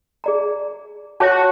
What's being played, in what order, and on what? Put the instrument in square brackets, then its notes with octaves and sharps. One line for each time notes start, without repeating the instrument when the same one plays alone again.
[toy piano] G#4 D5 A#5
[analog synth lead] F#4 [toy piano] C#5 A5